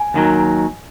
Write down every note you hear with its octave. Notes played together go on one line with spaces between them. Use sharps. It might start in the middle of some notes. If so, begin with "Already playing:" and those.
Already playing: G#5
D#2 D#3 F#3